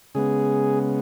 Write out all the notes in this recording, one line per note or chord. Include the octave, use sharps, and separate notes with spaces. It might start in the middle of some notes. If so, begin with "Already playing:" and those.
C#3 G#3 B3 G#4